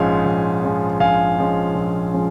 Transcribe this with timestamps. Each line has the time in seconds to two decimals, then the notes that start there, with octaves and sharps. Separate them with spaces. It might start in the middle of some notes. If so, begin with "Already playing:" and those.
Already playing: A#1 G#2 F3 G#3 C#4 F5 G#5
0.26 A#1
0.63 G#2 F3 G#3 C#4
1.00 A#1 F5 G#5
1.37 G#2 F3 G#3 C#4
1.75 A#1
2.13 F3 G#3 C#4